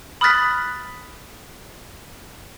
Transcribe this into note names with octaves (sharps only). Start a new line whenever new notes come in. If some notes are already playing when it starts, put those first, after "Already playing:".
B5 D#6 F6 F#6 A6 B6